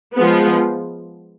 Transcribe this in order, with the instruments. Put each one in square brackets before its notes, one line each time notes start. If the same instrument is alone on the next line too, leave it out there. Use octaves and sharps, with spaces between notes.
[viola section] F3 G#3 B3